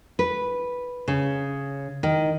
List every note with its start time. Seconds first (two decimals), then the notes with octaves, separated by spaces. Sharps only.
0.19 B4
1.08 C#3
2.03 D#3